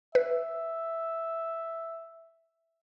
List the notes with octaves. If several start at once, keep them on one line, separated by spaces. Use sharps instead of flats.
B4 E5